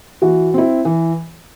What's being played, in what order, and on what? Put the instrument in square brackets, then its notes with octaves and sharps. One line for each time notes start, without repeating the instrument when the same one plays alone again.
[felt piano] E3 [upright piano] F#4
[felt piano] C4 E4
E3